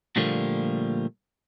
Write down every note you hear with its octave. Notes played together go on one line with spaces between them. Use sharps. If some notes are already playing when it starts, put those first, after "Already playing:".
A#2 D3 F3 G3 A3 A#3